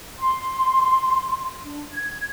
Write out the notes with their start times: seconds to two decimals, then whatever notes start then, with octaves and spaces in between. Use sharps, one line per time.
0.19 C6
1.65 D4
1.93 G#6